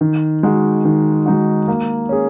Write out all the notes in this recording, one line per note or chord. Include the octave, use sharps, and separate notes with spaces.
D#3
G#3 D#4 F#4
D#3
G#3 D#4 F#4
A#3
C#4 G#4